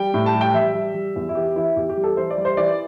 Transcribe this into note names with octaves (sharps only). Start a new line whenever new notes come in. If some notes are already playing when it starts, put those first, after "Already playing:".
Already playing: G3 G5
A2
A5
G3
G5
G3 E5
G3
G3
E2
E4
E3 G4
E3 E4
E2 G4
G4
G3
A4
E3 C5
D5
G3
C5
E3 D5